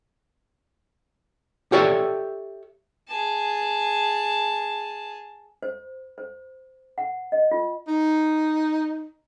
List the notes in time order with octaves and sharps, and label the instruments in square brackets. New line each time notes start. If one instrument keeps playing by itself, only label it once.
[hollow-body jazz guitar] G4 A4 C#5 D5 E5
[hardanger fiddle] G#4 A5
[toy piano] C5
C5
F#5
D#5
F4
[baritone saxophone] D#4